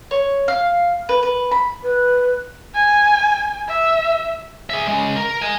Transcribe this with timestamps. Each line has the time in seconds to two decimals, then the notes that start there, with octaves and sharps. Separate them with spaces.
0.11 C#5
0.48 F5
1.09 B4
1.23 B4
1.52 B5
1.82 B4
2.75 G#5
3.68 E5
4.70 G#4 E5
4.87 G#3 C#4
5.16 A#4
5.42 D#5 G#5